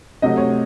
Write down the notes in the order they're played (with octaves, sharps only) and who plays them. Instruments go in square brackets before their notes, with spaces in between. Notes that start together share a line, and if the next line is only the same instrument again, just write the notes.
[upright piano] C3 F#3 A3 D#5
C#5